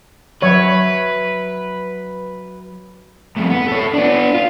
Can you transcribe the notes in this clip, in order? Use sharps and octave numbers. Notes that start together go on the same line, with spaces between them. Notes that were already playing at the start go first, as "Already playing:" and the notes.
F#3 B4 C#5 E5
F2 A2
B3
A4 C#5
B3 D4
F4